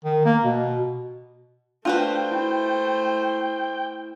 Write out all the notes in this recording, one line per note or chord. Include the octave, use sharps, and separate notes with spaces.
D#3
A#3
B2
A3 D4 F4 F#4 B4 C5 G5
E4